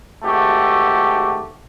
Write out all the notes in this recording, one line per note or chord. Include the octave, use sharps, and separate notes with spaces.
G#1 A3 F#4 G4